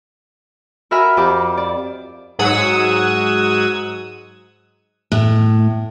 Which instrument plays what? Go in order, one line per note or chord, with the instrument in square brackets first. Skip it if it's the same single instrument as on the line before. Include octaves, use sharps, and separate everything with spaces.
[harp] F#4 A#4 E5 G#5 B5 F6
F2 G4 D6
D5
[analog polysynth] G#2 F#3 F#5 D#6 E6 G#6
[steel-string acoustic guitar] A2